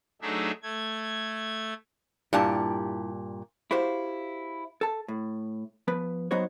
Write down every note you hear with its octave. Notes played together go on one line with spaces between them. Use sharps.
F#3 A3 D4 D#4 G#4 E5
A3 G#6
G2 A#2 E4 G4 D5 A5
E4 F#4 G4 C5 F5
A4 A5
A2
F3 B3 B4
F#3 B3 D#4 F#4 C5 C#5